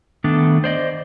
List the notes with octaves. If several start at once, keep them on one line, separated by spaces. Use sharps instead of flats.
D#3 A3 B3 D4 A4
C5 D5 D#5